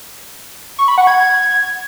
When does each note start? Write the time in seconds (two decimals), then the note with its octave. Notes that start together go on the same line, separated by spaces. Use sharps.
0.78 C#6
0.88 B5
0.98 F#5
1.07 G#6